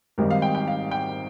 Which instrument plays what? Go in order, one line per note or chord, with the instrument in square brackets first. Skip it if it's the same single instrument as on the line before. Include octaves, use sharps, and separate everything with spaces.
[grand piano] G#1 G#2 G3 C4 D#4 A#4
F5
G5
G5
F5
G5